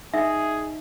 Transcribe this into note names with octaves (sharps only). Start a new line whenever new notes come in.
D#4 G#4 E5